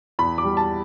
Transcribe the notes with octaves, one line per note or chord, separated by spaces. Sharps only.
E2 B5
D6
G3
A5